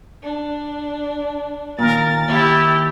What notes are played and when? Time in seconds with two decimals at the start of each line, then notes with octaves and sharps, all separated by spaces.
0.23 D4
1.79 D#2 A#2 A#4 A6
2.29 D#2 E4 G4